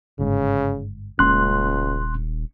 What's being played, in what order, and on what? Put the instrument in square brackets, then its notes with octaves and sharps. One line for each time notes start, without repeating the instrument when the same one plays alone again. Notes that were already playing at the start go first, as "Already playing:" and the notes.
[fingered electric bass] G1 G#2 [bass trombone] C#3
[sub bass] D#1 [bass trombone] C#2 [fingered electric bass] G#3 A#3 C#4 [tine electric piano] C6 F#6